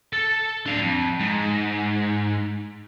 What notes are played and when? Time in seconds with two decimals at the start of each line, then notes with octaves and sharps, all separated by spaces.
0.13 A4 A5
0.66 D4 F5
0.81 F2
1.20 G#2